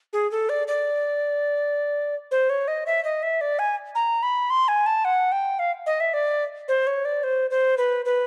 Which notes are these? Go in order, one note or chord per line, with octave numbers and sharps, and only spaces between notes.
G#4
A4
D5
D5
C5
C#5
D#5
E5
D#5
E5
D5
G#5
A#5
B5
C6
G#5
A5
F#5
G5
F5
D#5
E5
D5
C5
C#5
D5
C5
C5
B4
B4